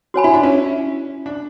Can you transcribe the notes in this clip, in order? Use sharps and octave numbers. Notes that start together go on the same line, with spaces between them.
F#4 C#5 G#5 B5
E4
D4
C#4 E4
D4